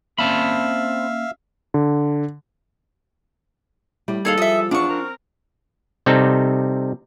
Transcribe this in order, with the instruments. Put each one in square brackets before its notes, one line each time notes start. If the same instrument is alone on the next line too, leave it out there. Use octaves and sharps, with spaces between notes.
[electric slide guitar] A#3 C#4 D5 [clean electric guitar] C4 A5 B5 [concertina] E5 F5
[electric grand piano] D3
[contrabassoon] A2 [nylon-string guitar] G3
[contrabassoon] D#2 [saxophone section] E3 G#3 A4 [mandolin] G#4 C#5 F5
[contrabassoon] F3 [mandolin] D#5 E5
[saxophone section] E2 [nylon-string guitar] D4 F4 F#5 [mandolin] C#6 D6
[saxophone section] C4 A#4
[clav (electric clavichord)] C3 G3 C4 D#4 A4